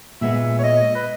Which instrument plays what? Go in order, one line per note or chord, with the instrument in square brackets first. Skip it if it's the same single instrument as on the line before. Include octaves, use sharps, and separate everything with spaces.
[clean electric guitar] A#2 G#3 B3 [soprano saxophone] E5
[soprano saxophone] C#5
D#5
B4